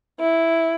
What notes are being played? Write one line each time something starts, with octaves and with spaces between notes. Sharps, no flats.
E4